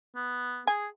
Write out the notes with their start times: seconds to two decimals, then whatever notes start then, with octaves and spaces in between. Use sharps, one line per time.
0.16 B3
0.67 G#4 G#5